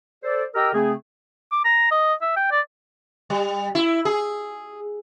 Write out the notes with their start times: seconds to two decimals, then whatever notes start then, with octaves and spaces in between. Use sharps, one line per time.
0.23 A4 C5 D5
0.55 G4 A#4 D#5 G5 A#5 E6
0.73 C#3 A3 C4 G#4
1.52 D6
1.65 A#5
1.91 D#5
2.21 E5
2.36 G5
2.51 D5
3.30 G3
3.75 E4
4.05 G#4